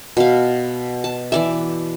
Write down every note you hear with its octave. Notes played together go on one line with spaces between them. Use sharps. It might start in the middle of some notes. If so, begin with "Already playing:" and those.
B2 F5
A5
E3 D5 E5